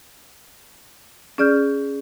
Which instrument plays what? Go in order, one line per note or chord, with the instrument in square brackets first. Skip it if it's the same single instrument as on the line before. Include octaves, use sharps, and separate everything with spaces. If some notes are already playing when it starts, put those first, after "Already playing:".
[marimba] C#4 G#4 D5 F6 G6